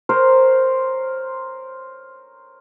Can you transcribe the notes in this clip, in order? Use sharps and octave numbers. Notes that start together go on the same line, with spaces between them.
A#4 C5 C#5